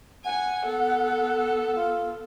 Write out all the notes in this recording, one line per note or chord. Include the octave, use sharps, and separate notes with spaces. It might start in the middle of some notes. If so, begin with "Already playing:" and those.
F#5 G#5
B3 A4
F4